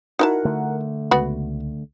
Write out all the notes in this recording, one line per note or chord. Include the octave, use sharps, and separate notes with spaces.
D#4 E4 F#4 A#4 F#5 A5
D3 A3
C#2 B3 F#4 B5